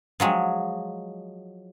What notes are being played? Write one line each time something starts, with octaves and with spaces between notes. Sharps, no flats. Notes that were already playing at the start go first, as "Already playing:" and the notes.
F3 F#3 G#3